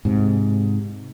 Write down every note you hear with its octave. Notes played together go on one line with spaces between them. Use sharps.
G#2 C3